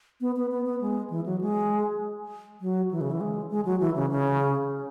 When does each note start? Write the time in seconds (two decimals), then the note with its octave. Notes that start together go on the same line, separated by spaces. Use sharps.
0.21 B3
0.36 B3
0.51 B3
0.66 B3
0.81 G#3
1.10 E3
1.26 F#3
1.41 G#3
2.61 F#3
2.91 E3
3.01 C#3
3.11 E3
3.21 G#3
3.50 G#3
3.65 F#3
3.80 E3
3.95 C#3
4.10 C#3